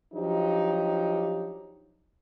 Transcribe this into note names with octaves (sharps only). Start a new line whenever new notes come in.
F3 F#3 D4 D#4 G4